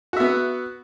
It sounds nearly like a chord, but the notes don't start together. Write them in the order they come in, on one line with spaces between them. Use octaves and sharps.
F#4 E5 B3